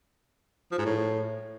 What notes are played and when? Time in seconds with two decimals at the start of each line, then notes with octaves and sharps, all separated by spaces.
0.72 F3
0.79 G#2
0.85 A2